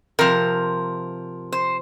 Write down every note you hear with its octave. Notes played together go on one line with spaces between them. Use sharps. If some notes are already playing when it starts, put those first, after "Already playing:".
C3 F3 A#4
C5